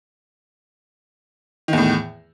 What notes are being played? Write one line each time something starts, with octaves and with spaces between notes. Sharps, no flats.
E2 A2 D#3